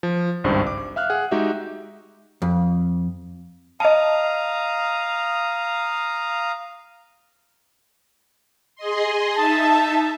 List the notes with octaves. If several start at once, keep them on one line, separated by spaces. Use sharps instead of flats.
F3
G#1 C#2 G2 C5
D6
E5 F5 F6 F#6
G#4 F#5
G#3 D#4 F#4 G4 E5
F2
D#5 F5 A5 A#5 D#6
G#4 D#5 C6
D#4 E5 A5